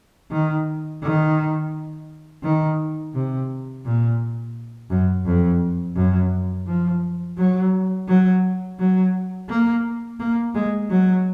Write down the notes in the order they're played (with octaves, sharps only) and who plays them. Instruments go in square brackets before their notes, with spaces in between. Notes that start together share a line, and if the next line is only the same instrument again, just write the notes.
[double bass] D#3
D#3
D#3
C3
A#2
F#2
F2
F#2
F3
F#3
F#3
F#3
A#3
A#3
G#3
F#3